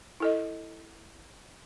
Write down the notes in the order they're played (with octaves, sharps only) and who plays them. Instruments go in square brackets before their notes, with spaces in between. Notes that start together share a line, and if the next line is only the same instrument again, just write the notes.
[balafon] E4 A4 D#5